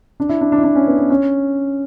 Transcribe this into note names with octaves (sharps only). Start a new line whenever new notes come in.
D4
E4
D4
D4
E4
D4
C#4
B3
B3
C#4